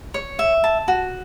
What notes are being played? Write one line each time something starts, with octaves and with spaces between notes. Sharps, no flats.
C#5
E5
A5
F#4